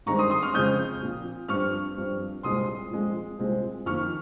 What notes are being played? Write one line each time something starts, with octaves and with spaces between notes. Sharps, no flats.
G2 D#3 G#3 C4 A#5 C#6
C6 D#6
C6 D#6
C#6 F6
F2 C#3 G#3 C4 D#6 G6
A#2 F3 C4
G2 F3 C4 C#6 F6
G2 F3 C4
C2 A#2 G#3 C4 C6 D#6
A#2 F3 G#3 C4
C2 A#2 G#3 C4
F2 D#3 A#3 C#6 F6